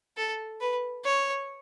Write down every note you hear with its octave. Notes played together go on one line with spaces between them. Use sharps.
A4
B4
C#5